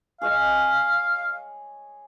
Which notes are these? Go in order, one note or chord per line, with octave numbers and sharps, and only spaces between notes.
G#4 C#5 D#5 F5